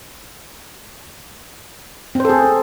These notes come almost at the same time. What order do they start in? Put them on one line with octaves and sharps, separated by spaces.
C4 C5 A4 G#4